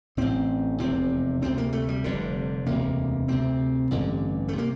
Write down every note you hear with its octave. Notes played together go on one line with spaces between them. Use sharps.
A1 A2 C4
F1 E2 C3 C4
D2 C3 C4
A#3
A3
G3
F1 F2 D3
E1 D2 C3 A#3
D2 C3 C4
A1 G2 D3
A3
C3
A#3